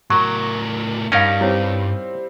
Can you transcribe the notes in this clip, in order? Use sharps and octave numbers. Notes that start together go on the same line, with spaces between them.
A2 F#3 A#4 C#6
G2 C#4 D#4 A#4 F5 A5
G3 C4 E4 C#5